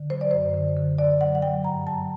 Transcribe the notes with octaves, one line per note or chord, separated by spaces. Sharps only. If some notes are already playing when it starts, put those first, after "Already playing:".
Already playing: D3
F#3 C5
D5
F#2 C5
D3
D3
D3 D5
F#3 F#5
F#5
F#3 G5
G2 A#5
F#3 A5